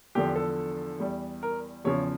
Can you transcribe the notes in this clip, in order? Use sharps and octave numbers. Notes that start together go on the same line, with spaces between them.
E2 D3 F3 G4
A4
E2 E3 G3
A#4
E2 C#3 F3 C#5